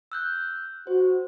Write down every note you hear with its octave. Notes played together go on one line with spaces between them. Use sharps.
E6 F#6 G6
F#4 C5